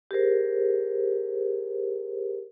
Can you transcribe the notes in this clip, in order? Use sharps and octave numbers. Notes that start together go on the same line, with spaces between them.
G4 G#4 A#4 C5